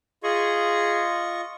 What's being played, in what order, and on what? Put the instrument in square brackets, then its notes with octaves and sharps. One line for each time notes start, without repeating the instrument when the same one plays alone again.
[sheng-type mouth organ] F4 D#5 C#6 [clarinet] G#4